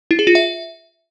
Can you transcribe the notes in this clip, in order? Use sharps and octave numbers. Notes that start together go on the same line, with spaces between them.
E4
G#4
F4
E5